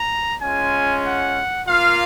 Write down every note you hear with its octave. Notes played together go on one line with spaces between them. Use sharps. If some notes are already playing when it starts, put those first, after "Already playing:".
Already playing: A#5
G#3 C#4 F4 G#5
F#5
A#3 F4 F5